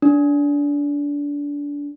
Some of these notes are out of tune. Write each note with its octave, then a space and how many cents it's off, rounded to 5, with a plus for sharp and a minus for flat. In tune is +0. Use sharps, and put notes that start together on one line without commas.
D4 -25